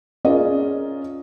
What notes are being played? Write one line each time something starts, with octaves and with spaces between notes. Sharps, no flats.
C#4 F4 G#4 A#4 D5 D#5